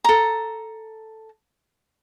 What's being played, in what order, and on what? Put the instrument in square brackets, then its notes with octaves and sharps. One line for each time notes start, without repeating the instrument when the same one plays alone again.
[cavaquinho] A4 A#5